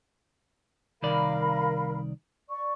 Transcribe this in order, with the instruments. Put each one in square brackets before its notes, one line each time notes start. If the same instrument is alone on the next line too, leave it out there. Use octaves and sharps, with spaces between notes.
[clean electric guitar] C2 D#3 D5 [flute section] A#4 F5 B5
[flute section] D5 C#6